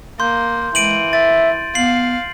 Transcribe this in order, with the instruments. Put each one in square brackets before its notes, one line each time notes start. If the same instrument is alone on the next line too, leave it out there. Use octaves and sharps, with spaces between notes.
[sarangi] A#3 [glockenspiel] C6 G6
[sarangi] E3 [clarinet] G#3 [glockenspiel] D7 D#7 F#7
[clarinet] E5 [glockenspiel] A6
[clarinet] B3 [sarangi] F5 [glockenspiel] C7 F#7